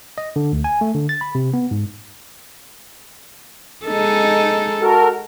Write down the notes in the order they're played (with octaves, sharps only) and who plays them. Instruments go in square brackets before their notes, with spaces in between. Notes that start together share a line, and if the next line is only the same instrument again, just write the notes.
[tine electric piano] D#5
D3
D2
G#5
A3
D3
A6
B5
C3
B3
G#2
[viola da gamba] G#3 D#4 A4
[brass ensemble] F#4 A4 A#4